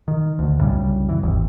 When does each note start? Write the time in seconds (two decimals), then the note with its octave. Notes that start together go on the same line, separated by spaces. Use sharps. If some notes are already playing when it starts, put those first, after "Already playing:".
0.08 D#3
0.39 D2
0.59 C2 F#2 C#3 G3
1.09 E3
1.23 G#1 D#2